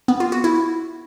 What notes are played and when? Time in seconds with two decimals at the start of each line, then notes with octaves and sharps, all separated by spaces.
0.08 B3
0.20 F4
0.32 F#4
0.44 E4